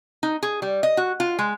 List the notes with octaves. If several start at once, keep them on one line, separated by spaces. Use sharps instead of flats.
D#4
G#4
G3
D#5
F#4
F4
G#3